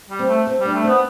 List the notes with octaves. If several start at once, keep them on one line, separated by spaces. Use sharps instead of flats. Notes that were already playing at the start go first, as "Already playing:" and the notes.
G3
C4
A3
C4
G3
D4
A3
B3 C4